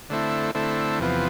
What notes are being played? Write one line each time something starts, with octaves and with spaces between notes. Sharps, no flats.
D3 A3 C4 E4
D3 A3 C4 E4
E2 C3 F3 B3